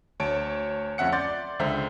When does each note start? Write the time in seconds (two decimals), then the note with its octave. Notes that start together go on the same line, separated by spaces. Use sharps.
0.20 D2 C#5 A5 D7
0.98 F2 C#4 E5 F#5 C#7
1.12 D5 C6 G6 A6
1.59 C#2 D3 C5 E5 A#5